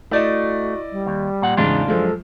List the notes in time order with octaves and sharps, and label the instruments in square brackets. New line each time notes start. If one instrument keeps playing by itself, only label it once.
[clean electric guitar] A3 [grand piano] E4 D5 D#5 [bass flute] F#4
[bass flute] G3
[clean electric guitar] D#2
A#2 F#5
[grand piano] E2 G#2 C#3 [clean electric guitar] D4 F4
[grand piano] F#2 F3 G#3 [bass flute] A4